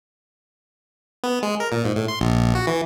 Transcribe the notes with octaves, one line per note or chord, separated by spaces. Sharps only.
B3
G#3
A#4
A#2
G#2
A2
C6
A#1
F#4
E3